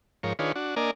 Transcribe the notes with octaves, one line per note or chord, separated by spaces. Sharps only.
G#2 F3 A#4 C#5
D#3 D4 F4 G#4 B4 C#5
D4 F#4
A#3 D4 A#4 D5 D#5 G#5